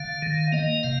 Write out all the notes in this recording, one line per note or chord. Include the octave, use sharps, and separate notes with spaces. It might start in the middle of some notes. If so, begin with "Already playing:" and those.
Already playing: D3 F5
D#3
A#3 D#5
C3 F5